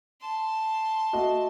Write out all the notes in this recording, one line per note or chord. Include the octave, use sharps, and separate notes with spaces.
A5 C6
A3 F#4 D#5